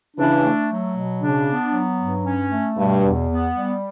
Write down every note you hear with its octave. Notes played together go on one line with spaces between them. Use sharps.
C#3 E3 D4
A3
F#3
B2
C#3 D4
B3
F#3
G2
C#4
A3
G2 B2
E2
B3
G3